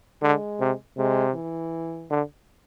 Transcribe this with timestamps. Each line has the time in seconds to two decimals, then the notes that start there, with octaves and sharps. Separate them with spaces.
0.22 D3 G#3
0.60 C3
0.98 C3 G#3
1.34 E3
2.10 D3